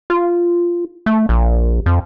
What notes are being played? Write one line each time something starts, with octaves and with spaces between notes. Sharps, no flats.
F4
A3
A#1
F2